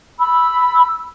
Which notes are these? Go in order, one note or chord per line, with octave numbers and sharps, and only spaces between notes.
B5 E6